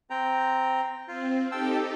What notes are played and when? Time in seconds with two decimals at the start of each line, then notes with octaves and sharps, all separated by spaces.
0.10 C4 G5 A#5
1.08 C4 F4
1.52 D#4 G4 A4 G5 A5 E6